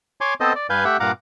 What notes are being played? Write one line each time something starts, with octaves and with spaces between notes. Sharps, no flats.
C#5 G#5 C6 D6
B3 C4 A4 C5 D#5
D5
G2 B4 F5 G#5 G6
A3 G4 E5 F#5 G5
G2 A#2 F5 F#5 A#5 D6